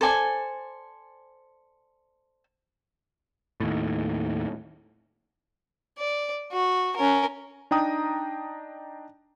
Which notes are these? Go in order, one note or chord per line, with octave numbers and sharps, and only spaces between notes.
A4 C5 D5 G#5
D#2 A2
D5
F#4
C#4 A#4
D4 D#4 G5 A#5 D#6